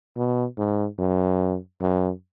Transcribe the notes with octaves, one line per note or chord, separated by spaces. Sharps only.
B2
G#2
F#2
F#2